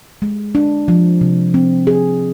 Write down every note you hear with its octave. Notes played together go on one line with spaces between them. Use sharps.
G#3
D4
F3
C3
C4
G#4